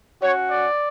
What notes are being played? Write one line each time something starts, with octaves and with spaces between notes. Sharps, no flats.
C#4 F#4 C#5
D5